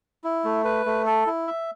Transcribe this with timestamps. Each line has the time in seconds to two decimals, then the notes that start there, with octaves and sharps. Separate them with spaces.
0.24 E4
0.44 A3
0.65 B4
0.86 A3
1.06 A4
1.27 E4
1.47 E5